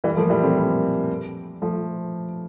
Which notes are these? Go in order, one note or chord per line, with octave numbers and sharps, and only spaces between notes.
E3 G3
A#3
F3 A3
E3 G3
A3 C4
G3 A#3
F3 A3